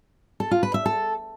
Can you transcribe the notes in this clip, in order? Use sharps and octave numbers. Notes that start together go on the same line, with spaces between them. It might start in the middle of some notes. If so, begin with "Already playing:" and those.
A4
F4
B4
E5
A4